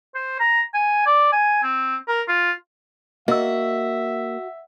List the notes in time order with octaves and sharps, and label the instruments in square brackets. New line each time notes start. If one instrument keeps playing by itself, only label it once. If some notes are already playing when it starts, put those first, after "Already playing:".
[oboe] C5
A#5
G#5
D5
G#5
C4
A#4
F4
[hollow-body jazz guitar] A#3 [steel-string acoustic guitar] F#4 [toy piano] D#5 E6 [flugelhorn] E5